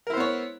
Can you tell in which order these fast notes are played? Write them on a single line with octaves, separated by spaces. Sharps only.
A#4 E4 C5 B3 C#5